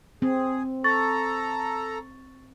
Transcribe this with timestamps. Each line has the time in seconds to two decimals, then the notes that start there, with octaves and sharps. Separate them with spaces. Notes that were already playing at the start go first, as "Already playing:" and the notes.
0.22 C4 G#4
0.84 A4 A#5 C#6 A6